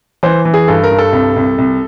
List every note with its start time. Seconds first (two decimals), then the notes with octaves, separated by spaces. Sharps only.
0.23 E3 C5
0.45 E3
0.54 G#4
0.68 G2 A4
0.84 A#4
0.91 G2
0.98 A4
1.13 C2
1.36 C2
1.58 C2